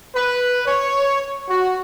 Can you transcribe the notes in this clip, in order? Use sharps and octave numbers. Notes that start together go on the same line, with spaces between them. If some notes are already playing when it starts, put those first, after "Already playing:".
B4
C#5
F#4